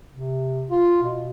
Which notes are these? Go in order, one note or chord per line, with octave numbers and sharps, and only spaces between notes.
C3
F4
B2